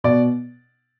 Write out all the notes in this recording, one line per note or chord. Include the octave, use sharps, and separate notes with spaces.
B2 D5